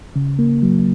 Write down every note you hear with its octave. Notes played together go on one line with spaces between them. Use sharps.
C#3
A#3
F#3